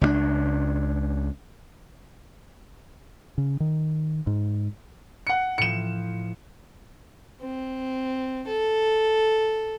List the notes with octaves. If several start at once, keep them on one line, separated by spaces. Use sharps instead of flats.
C#2 G3 D4
C#3
D#3
G#2
F#5 C#7
A2 F3 C#7 E7
C4
A4